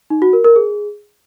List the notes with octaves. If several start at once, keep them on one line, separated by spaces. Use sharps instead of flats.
D#4
F#4
A#4
A#4
G#4